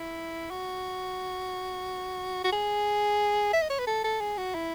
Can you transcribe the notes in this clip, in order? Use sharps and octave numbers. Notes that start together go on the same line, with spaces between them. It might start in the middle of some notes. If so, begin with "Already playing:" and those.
Already playing: E4
F#4
F#4
G#4
E5
D#5
C#5
B4
A4
A4
G#4
F#4
E4